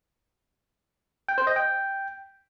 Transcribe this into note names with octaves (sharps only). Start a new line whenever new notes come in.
G5
C5
D#5
G5